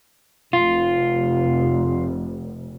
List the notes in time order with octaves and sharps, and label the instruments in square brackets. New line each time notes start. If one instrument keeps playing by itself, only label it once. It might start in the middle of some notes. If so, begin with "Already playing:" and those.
[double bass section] F1 [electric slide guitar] F4